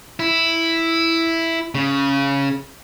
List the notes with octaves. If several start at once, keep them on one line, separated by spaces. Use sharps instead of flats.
E4
C#3